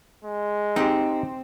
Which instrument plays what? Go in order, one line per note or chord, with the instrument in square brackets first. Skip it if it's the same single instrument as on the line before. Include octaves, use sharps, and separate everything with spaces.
[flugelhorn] G#3
[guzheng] C4 [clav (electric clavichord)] D#4 G4